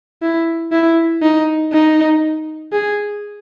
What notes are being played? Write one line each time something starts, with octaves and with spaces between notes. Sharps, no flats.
E4
E4
D#4
D#4
G#4